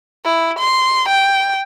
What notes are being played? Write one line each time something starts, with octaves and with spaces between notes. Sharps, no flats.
E4
C6
G5